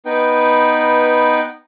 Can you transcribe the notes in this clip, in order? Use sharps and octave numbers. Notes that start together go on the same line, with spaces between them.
B3 D#4 B4 G5